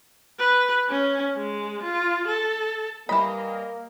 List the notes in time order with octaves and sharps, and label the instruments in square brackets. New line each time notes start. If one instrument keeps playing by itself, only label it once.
[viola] B4
C#4
G#3
F4
A4
[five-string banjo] E3 B5 [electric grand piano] G3 D#5 [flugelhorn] A#3